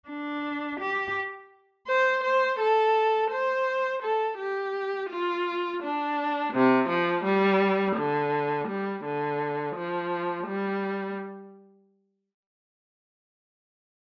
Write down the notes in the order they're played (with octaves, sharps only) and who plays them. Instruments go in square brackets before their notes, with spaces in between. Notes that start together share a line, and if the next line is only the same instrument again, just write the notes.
[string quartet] D4
G4
C5
C5
A4
C5
A4
G4
F4
D4
C3
F3
G3
D3
G3
D3
F3
G3